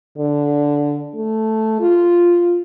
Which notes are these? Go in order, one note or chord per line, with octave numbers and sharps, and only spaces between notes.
D3
A3
F4